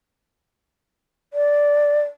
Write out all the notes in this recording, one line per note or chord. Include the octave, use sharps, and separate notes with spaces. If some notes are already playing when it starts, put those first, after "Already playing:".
D5